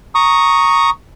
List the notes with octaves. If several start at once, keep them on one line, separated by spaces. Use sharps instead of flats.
A#5 C#6 D#6